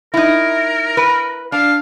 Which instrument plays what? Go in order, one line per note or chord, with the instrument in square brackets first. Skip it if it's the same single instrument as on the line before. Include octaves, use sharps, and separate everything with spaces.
[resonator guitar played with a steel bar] D#4 E4 [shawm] A#4
[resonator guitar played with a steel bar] B4
[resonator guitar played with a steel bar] D4 [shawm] F5